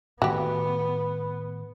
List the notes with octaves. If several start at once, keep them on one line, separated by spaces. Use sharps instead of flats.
A2 D#3 A3 B3 F#4 G4